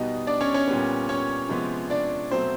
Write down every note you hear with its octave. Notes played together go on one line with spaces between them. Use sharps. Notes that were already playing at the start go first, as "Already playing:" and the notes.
Already playing: B2 G3 B3 D#4 D#5
D4 D5
C#4 C#5
C#4 C#5
A#2 G3 B3
C#4 C#5
C3 F3 G#3 B3
D4 D5
B2 F#3 A3 C4 C5